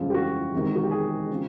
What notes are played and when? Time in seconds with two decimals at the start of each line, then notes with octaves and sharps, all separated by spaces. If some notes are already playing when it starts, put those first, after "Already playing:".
Already playing: G1 F2 C#3 E3 G#3 F4
0.10 G4
0.14 F#4
0.52 E1 E2 C3 D#3
0.76 F#4
0.84 G4
0.91 G#4
1.30 C#3 F3